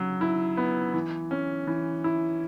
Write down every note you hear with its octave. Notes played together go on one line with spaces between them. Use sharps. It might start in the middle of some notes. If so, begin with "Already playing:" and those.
Already playing: C#3 F#3
E4
B3
E3
C#4
E3
E4